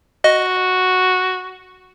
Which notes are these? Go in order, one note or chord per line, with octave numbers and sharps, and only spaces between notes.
F#4 D#5